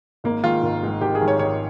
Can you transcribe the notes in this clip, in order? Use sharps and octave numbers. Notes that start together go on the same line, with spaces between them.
G#1 A#3
G#2 D#3 F4
G#1
G#2 D#3
G#1 G4
G#4
G#2 D#3
C#5
G#1 C#5